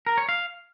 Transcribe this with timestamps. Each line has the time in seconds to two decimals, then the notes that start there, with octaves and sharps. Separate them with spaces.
0.07 A#4
0.18 C#5
0.29 F5